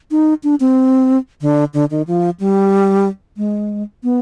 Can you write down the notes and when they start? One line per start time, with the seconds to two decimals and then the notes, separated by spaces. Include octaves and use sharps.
0.11 D#4
0.44 D4
0.60 C4
1.41 D3
1.74 D3
1.91 D#3
2.07 F3
2.40 G3
3.37 G#3
4.03 B3